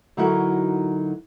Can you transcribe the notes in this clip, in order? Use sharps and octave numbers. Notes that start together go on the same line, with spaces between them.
D3 F#3 D#4 E4 F#4 A#4